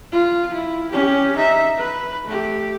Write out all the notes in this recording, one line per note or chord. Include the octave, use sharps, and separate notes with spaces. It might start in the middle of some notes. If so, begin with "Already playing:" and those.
F4
E4
C#4 G4
D#4 E5
B4
A3 G4